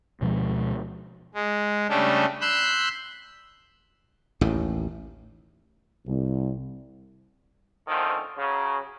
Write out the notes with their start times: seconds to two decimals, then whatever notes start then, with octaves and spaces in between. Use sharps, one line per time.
0.21 D2 B2 F3 G#3
1.34 G#3
1.89 C#3 G3 A3 C#4 D4 G4
2.41 B5 C6 E6 F#6 G6
4.41 A1 D#2 A2
6.06 C2
7.87 D3 D#3 F3 A3 C4 C#4
8.37 C#3 F#3